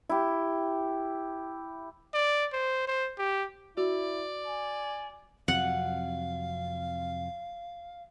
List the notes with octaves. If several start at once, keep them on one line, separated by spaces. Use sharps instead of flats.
E4 G4
D5
C5
C5
G4
E4 F#4 D5
G#5
F2 C3 F#3 F5 F#5